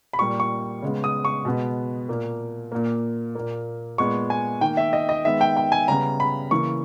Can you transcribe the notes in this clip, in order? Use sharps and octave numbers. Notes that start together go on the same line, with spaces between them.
B5
A#2 G3 A#3 C#6
C#6
C#3 G#3 B3
D#6
C#6
B2 G#3 B3
A#2 A#3
A#2 A#3
A#2 A#3
A#2 G#3 B3 C#6
G#5
D#3 A#3 G5
E5
D#5
D#5
D#3 G#3 B3 E5
G5
G5
G#5
C#3 G3 B3 A#5
B5
C#3 E3 A#3 C#6